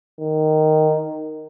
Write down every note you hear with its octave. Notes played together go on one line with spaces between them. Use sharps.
D#3